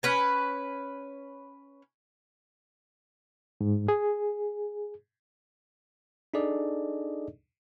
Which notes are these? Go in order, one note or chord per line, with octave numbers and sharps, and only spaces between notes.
C#4 B4 G#5
G#2
G#4
D4 D#4 G#4 A4 D5 D#5